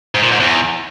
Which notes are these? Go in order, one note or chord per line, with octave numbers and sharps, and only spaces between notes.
G#2
A#2
G#2
E2